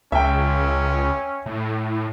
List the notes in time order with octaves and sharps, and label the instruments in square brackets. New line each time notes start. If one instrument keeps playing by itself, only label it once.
[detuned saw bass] C#2 [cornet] C#4 [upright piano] E5 G5
[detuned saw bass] A2